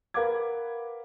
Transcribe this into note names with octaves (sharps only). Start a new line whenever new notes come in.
A#4 B4 F5 F#5 D6 G#6